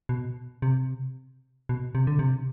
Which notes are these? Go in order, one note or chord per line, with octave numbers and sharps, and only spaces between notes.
B2
C3
B2
C3
D3
C3